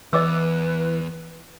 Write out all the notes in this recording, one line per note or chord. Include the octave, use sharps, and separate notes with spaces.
E2 E3 B4 D#5 D6 E6